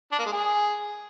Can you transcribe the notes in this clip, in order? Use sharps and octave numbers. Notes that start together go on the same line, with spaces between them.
D4
A#3
G#3
G#4